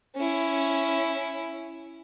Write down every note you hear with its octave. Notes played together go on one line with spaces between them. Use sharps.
C#4 E4